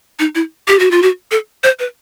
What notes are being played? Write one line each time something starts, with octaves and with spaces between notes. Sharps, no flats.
D#4
E4
G4
F#4
F4
F#4
A4
C5
B4